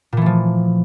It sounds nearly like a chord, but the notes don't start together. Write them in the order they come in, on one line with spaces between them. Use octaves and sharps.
A#2 E3 A3 F3